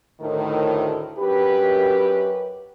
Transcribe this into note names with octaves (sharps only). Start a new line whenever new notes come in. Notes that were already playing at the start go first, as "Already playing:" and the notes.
D2 A2 D#3
F#2 G4 B4